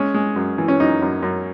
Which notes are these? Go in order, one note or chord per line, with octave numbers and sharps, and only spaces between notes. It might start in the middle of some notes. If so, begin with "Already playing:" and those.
Already playing: G#3 C#4
G#3
F#2
E3
C#4
F#2 D#4
F#2
F#2